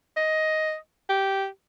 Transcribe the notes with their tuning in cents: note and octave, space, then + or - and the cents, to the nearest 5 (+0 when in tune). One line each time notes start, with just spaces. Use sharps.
D#5 +10
G4 -10